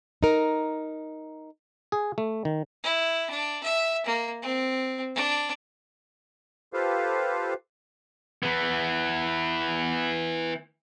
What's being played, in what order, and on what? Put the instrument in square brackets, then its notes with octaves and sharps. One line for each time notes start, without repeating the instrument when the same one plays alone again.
[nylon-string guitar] D#4 A#4
[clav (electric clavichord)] G#4
A3
D#3
[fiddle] E4
D4
E5
A#3
C4
D4
[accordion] F4 G4 A4 B4 C5 F5
[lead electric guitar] E3 B3